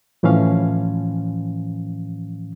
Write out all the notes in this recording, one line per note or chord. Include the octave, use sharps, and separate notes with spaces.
A2 E3 F3 C#4 F5